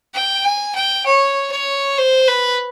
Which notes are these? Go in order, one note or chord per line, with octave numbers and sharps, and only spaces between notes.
G5
G#5
G5
C#5
C#5
C5
B4